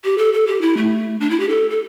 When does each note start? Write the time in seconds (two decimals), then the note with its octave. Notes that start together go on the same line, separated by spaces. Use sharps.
0.05 G4
0.18 A4
0.34 A4
0.47 G4
0.62 E4
0.77 A3
1.20 D4
1.30 E4
1.40 G4
1.49 A4
1.70 A4